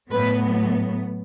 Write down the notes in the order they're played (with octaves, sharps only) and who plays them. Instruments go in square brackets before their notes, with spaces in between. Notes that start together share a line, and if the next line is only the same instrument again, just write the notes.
[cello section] A2 F#3 B3 B4